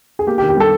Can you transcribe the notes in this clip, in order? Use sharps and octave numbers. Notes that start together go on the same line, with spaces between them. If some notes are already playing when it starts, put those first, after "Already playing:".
G#4
A#3 G4
G4
D#3
G4
G3 A4